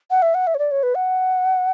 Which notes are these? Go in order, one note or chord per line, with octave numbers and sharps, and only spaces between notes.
F#5
E5
F#5
E5
C#5
D5
C#5
B4
F#5